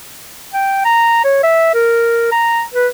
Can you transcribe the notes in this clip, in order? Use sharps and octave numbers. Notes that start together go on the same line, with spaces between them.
G5
A#5
C#5
E5
A#4
A#5
B4